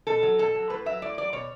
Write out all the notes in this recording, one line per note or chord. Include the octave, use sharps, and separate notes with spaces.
B2 A4
F#3
B2 A4
F#3
A2 B4
F#3 E5
A2 D5
F#3 D5
B2 C#5